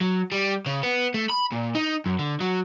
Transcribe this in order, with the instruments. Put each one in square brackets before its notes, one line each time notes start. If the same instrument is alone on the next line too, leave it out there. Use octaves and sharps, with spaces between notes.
[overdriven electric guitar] F#3
G3
C#3
B3
A3
B5
A#2
D#4
F#2
D3
F#3